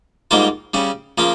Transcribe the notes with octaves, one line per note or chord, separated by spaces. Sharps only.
G#2 G3 A#3 F4 C5
C#3 G3 C#4
C#3 F3 A#3 F4